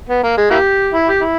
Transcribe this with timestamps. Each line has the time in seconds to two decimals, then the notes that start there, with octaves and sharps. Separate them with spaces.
0.09 B3
0.24 A#3
0.37 G#3
0.51 A#3 E4 G4
0.94 E4
1.07 G4
1.21 E4